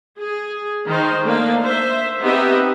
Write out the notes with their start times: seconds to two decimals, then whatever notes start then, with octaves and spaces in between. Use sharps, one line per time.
0.19 G#4
0.87 D#3 D#4 C5
1.24 A3 A#3 D4 D#4 F5
1.63 C5 E5
2.21 B3 C4 D#4 G4 D#5 E5